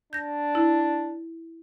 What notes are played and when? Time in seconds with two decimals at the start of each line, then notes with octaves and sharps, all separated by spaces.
0.13 D4 G6 A#6
0.55 E4